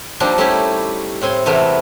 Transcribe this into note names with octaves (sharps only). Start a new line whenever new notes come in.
F3 G3 A#3 C4 D4 D#4
G3 A3 C#4 D#4 E4 G4
A2 C4 G#5 C6
E2 C3 A3 B3 A#4 A#5